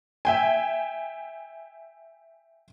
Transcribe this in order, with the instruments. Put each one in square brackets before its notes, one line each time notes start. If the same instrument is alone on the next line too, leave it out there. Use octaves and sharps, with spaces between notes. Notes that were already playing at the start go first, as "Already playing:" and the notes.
[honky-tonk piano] E5 G5 G#5